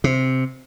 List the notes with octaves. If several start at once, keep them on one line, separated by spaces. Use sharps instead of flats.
C3